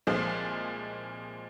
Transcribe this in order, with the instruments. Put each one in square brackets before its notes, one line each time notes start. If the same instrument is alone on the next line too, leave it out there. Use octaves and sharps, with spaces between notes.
[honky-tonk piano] C2 A#2 F3 G#3